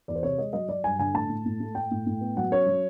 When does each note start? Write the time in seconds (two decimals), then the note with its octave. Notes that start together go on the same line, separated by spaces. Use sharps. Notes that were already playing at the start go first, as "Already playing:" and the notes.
0.08 E2 D5
0.15 C5
0.23 C3 C#5
0.38 G#3 D#5
0.53 F#3 D#5
0.68 F#3 D5
0.84 G2 G#5
0.99 D3 G#5
1.14 A2 A5
1.29 A2
1.46 A2
1.60 A3
1.75 A2 G5
1.91 A2
2.07 A2
2.21 B3
2.37 F#3 F#5
2.51 C#4 C#5
2.66 F#3